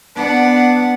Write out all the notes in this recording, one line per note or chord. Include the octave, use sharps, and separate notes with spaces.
B3 D4 F#5